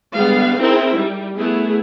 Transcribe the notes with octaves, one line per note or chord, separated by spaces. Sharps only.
D3 G3 G#3 B3 F5
C4 D#4 E4 G#4 A#4 E5
G3
A3 B3 E4 G#4